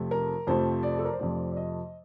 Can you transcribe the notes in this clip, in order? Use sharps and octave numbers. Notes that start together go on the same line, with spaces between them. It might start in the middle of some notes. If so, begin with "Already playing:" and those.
Already playing: F2 C3 F3 A3
A#4
F2 C3 F3 A3 C5
D5
A4
A#4
C5
F2 C3 F3 A3 D5
D5
D#5